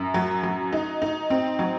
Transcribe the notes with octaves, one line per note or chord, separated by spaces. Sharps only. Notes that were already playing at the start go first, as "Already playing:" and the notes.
Already playing: F#2
F#3
F#3
D#4
D#4
C4
F#3